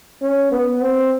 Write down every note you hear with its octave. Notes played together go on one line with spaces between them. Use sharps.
C#4
B3
C4